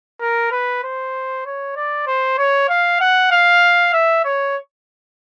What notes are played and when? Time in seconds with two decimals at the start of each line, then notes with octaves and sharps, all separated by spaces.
0.21 A#4
0.52 B4
0.84 C5
1.46 C#5
1.76 D5
2.07 C5
2.38 C#5
2.69 F5
3.01 F#5
3.31 F5
3.93 E5
4.25 C#5